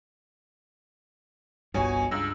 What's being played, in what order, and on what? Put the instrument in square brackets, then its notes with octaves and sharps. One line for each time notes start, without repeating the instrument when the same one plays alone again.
[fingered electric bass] G1 C2 G2 [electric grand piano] B2 C#5 G#5
[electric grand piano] C#2 E6 A#6 [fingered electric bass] G2